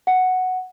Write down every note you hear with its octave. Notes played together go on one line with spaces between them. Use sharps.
F#5